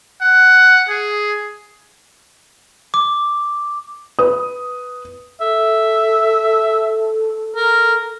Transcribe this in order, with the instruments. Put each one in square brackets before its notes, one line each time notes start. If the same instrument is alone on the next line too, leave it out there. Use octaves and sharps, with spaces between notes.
[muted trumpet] F#5
G#4
[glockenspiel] D6
[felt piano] B4 D#6
[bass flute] A4 [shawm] E5
[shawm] A#4